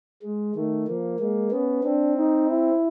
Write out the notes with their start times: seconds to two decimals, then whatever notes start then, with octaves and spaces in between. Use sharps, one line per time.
0.22 G#3
0.55 D#3 A3
0.87 F3 A#3
1.19 G#3 A#3
1.51 B3 C#4
1.83 C4 D4
2.16 D#4
2.48 E4